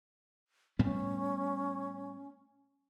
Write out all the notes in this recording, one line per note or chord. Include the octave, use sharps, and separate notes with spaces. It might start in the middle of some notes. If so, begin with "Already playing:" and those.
A2 G3 B3 C#4